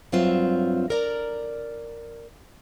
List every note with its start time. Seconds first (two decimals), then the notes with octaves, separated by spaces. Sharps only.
0.12 G2 F#3 C4 F4 E5
0.90 A#4 D5 A#5